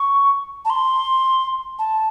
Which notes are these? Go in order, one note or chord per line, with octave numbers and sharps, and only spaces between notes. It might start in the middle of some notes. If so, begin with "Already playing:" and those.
Already playing: C#6
A5
C6
A5